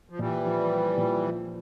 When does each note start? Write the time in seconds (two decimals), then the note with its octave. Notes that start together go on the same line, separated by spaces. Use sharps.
0.10 F3
0.19 A#2 E3 G3
0.45 F3
0.72 F4
0.98 A#2
1.25 F3